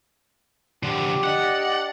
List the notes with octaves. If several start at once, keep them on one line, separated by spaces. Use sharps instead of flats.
D3 F3 G4
D4 D5 D#5 F#5